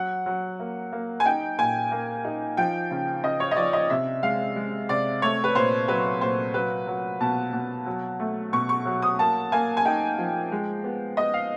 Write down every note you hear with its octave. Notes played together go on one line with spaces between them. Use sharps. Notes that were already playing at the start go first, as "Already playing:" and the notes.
Already playing: F#3 F#5
F#3
A#3
A#3
G#5
D#4 G5
A#2 G#5
A#3
D#4
F3 G5
C#3
C#3 D#5
C#5
D#5
F3 D5
D#5
C3 E5
G#3 F5
G#3
C3 D5
A3 C#5
B4
A#2 C5
F#3 B4
A#2 C5
F#3 B4
F#3
B2 A5
B2
F#3
A3
B2 C#6
C#6
F#3
D#6
A#3 A5
A#3 G#5
G#5
D#4 G5
F3
G#3
B3
B3 D#5
F5